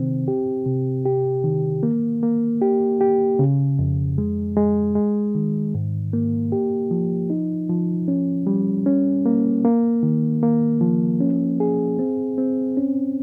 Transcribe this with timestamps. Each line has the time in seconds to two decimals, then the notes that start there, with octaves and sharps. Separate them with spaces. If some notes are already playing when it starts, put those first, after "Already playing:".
Already playing: C3 D#3 C4
0.28 G4
0.66 C3
1.06 G4
1.44 D#3
1.83 A#3
2.23 A#3
2.61 G4
3.01 G4
3.39 C#3
3.79 F2
4.18 G#3
4.57 G#3
4.95 G#3
5.35 D#3
5.74 G#2
6.13 A#3
6.52 G4
6.91 F3
7.30 D#4
7.69 F3
8.08 C#4
8.47 G3
8.86 C#4
9.26 A#3
9.65 A#3
10.03 D#3
10.43 A#3
10.81 F3
11.20 C#4
11.60 G#4
11.99 C4
12.38 C4
12.77 C#4